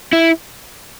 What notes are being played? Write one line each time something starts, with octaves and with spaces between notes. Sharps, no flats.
E4